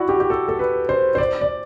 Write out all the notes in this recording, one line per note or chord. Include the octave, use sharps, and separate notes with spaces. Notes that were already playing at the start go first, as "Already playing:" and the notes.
Already playing: E4 F#4 D5
G4
G4
A4
A4
B4
C5
C5
D5
D5